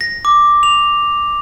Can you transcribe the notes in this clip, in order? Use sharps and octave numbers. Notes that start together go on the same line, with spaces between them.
A#6
D6
F7